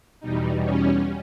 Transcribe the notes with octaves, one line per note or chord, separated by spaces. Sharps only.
E2 B2 G3 D#4
C#4